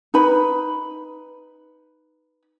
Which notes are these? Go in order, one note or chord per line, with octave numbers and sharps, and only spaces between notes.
D#4 B4 B5